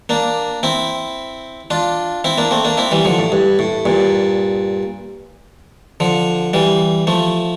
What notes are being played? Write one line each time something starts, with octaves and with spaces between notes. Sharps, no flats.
A#3 D4
C4 E4
D4 F4
C4 E4
A#3 D4
A3 C4
A#3 D4
C4 E4
E3 G3
D3 F3
A2
G2
A2
G2 A#2
D3 F3
E3 G3
F3 A3